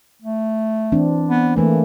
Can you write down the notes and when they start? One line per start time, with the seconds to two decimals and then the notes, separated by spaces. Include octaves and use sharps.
0.22 A3
0.92 E3 C4 D4
1.28 B3
1.56 E3 A3 A#3